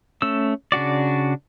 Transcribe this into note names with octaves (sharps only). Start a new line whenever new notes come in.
A3 C#4 E6
C#3 D4 F#4 D5